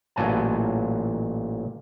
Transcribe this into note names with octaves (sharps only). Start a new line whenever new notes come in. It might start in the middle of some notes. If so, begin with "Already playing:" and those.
A1 A#2 F#3 G#5 A5